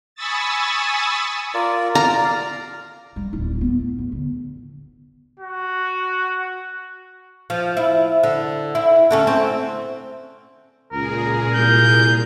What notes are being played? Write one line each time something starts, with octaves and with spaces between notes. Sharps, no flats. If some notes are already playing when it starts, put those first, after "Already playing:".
G#5 B5 C#6 D#6 E6 A6
F4 A#4 D5
D5 F5 A#5
G3
D1 E4
A3 B3
E2
D3
F#4
F3
E4
D3
E4
D3 A3 C#4
C4
C#2 A#2 G#4 A#4
C2 G6